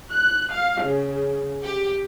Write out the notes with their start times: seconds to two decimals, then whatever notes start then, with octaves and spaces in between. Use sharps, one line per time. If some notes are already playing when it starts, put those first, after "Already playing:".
0.11 F#6
0.52 F5
0.81 C#3
1.63 G4